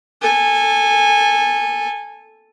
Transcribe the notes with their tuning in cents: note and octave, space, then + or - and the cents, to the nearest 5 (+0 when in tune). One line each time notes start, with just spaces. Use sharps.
A4 +0 G#5 -20